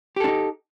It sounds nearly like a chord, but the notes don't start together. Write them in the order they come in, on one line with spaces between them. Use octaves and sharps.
G4 A4 D4 D#4